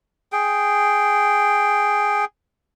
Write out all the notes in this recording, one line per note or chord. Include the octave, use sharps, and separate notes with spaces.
G#4 G5